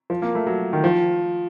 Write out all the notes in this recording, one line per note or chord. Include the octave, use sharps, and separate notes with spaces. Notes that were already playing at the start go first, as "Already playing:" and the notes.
F3
A#3
A3
F#3
D#3
F3